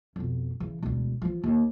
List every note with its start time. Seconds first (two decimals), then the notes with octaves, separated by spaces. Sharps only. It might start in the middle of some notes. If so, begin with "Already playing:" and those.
0.16 F2 B2
0.60 C#3 E3
0.83 E1 D2
1.22 E3 F3
1.43 D#2